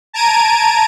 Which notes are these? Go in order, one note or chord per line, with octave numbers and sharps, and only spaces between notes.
A5 A#5 G#6 D7 D#7